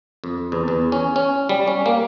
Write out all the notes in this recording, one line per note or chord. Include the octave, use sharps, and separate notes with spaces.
F2
E2
E2
C#4
C#4
G3
C#4
A#3